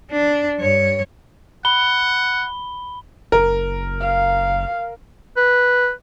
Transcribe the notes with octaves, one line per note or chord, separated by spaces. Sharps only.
D4
G2 C#5
F#5 B5 G7
F#1 A#4
F5
B4